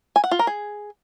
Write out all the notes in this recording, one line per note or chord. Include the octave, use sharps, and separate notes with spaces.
G#5
F#5
F4
A#4
G#4